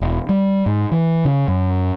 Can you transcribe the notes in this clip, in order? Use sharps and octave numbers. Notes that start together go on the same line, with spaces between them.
E1
G3
G#2
E3
C#3
F#2